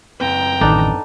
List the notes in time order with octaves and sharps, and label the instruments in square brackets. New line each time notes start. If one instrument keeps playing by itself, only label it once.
[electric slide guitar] F#2 C4 B4 [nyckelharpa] G5 A#5
[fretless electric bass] A1 D#3 [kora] D4 D#4 A4